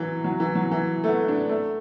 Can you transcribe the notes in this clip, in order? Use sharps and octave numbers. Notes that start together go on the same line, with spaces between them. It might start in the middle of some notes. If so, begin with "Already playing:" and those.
Already playing: E3 F#3
F#3
E3
F#3
E3
A3
B3
D4
A3